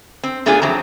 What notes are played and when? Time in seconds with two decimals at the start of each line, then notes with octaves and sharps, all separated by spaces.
0.23 C4
0.46 G#2 A3 B3 D4 F4 G#4
0.62 F2 F#3 C4 A#5